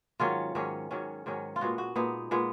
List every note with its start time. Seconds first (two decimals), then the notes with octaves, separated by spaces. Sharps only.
0.20 G#2 D#3 F#3 C#4 F4
0.55 G#2 D#3 F#3 C#4
0.91 G#2 D#3 F#3 C#4
1.26 G#2 D#3 F#3 C#4
1.56 F4
1.61 A#2 G#3 B3 F#4
1.78 F#4
1.96 A#2 G#3 B3 D#4
2.31 A#2 G#3 B3